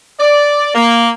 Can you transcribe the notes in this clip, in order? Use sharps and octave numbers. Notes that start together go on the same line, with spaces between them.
D5
A#3